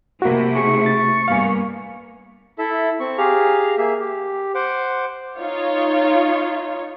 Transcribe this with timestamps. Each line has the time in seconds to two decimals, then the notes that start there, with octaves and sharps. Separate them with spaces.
0.22 C3 A3 A#3 E4 F#4
0.56 G#4 C#6
0.86 A6
1.28 G2 A#3 B3 F5 G#5
2.59 E4 A4 E5
3.00 C4 C#6
3.18 G4 G#4 F5 A#5
3.78 A#3 G#4 E5
3.99 G4
4.55 C5 F#5 D6
5.39 D#4 F4 C#5